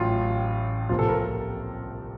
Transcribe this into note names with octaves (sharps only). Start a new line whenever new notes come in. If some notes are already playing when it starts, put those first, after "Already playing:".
Already playing: A1 A2 F#3 F4
C2 A#2 F3 A#3 F4
A4
A#4